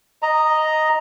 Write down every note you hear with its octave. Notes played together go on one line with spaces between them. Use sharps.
D#5 A#5